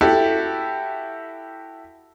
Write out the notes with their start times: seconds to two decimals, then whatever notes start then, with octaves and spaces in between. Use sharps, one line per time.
0.01 E4 F#4 G4 A4